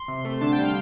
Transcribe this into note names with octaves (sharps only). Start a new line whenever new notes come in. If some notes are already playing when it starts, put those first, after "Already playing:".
Already playing: C6
C3
A3
D3 A5
G5
G3
F5